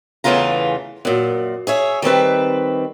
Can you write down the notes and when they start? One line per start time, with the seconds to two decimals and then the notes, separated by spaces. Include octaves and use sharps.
0.24 E2 C#3 E3 A3 F4 A#5
1.05 F#2 A#2
1.67 G#4 C#5 E5
2.02 D#3 G3 C4 B4